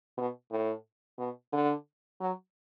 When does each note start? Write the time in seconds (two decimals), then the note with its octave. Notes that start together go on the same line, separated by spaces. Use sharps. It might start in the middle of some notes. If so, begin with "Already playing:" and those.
0.17 B2
0.51 A2
1.18 B2
1.52 D3
2.20 F#3